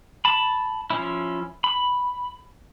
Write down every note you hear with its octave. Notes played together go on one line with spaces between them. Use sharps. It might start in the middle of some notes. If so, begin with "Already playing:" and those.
A5 B5
F3 C#4 E4
B5